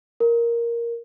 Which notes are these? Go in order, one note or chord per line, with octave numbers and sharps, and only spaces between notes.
A#4